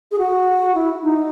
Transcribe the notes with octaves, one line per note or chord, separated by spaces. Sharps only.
G#4
F#4
E4
D#4